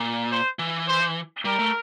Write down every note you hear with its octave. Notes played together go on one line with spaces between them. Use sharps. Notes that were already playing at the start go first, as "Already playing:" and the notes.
Already playing: A#2
C5
E3
C5
G3 A#4
A3